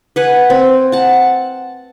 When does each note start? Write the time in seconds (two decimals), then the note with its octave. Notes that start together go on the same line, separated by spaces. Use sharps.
0.16 B4 F#5 G#5
0.50 C4
0.92 F#5 A5